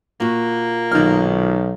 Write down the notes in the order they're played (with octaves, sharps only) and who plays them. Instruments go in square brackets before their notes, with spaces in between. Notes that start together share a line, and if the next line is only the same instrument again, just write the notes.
[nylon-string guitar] A#2 F#4 [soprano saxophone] A#3
[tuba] B1 [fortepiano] D#3 F6